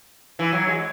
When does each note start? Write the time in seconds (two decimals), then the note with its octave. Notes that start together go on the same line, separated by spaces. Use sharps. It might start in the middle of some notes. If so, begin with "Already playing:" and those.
0.39 E3
0.53 F#3
0.67 G#3